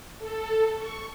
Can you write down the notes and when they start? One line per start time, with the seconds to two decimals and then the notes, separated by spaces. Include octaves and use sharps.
0.19 A4
0.77 C#6